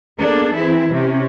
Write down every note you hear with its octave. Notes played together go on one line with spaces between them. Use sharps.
A#3 B3 D4 G#4 A4
E3 C4 E4
C3 C#4